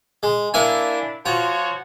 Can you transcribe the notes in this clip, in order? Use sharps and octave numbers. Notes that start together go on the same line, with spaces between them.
G#3
A#3 D4 E4 E5 G#5
F3 F4 F#4 C#5